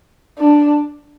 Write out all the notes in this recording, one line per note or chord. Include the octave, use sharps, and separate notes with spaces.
D4